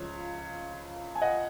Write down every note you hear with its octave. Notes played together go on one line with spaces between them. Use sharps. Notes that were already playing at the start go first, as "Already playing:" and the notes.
Already playing: C#2 C#3 F3 C#5
G#5
D#5 F#5